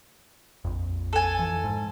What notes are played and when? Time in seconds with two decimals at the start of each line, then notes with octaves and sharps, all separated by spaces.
0.65 A#1 F2
1.13 A4 G#5
1.39 F2 E3
1.64 G#2